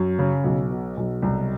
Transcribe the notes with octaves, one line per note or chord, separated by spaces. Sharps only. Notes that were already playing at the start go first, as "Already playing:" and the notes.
Already playing: F#2
C#3
B1
B2
B1
C2